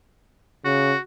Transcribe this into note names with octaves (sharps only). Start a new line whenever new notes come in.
C#3 F#4